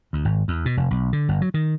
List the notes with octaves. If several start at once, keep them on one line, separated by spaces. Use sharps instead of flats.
D2
G#1
E2
B2
F1
B1
D3
G1
F#3
D#3